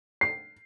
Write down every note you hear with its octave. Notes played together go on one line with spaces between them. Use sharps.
C7